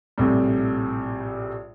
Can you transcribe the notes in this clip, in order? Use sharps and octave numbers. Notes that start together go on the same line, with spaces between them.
A#1 A2 C3 G3